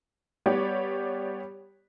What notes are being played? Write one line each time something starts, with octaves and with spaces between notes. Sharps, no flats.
G3 B3 G4 C#5 D5